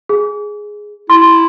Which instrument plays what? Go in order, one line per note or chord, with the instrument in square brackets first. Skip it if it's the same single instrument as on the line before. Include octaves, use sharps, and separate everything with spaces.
[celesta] G#4
[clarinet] E4 [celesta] C6